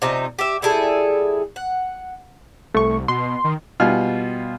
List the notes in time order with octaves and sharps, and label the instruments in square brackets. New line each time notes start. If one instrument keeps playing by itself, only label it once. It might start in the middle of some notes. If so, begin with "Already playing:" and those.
[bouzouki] C3 F3 D#4
G4 E5
G3 E4 G#4 A4
F#5
[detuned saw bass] C2 [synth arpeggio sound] A3 C#6
[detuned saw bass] B2 [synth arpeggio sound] C6
[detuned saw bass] D#3
[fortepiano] B2 G3 F4 G#5 F6